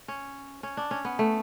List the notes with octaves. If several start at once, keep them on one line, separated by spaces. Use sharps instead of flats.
C#4
C#4
D4
C#4
B3
A3